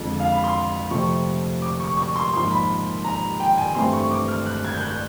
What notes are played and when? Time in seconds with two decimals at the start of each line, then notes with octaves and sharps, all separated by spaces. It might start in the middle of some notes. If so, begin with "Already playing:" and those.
Already playing: F2 D3 F3 G#3
0.20 F5
0.32 B5
0.44 C6
0.91 F2 C3 F3 A3 C4 C#6
1.62 D6
1.80 C#6
1.97 C#6
2.16 C6
2.33 G#2 F3 A#3 C6
2.51 B5
3.04 A#5
3.40 G5
3.58 G#5
3.75 G2 E3 A3 C4 C6
3.93 C#6
4.11 D6
4.28 F6
4.47 F#6
4.65 G#6
4.73 G6
4.81 F#6
4.90 G6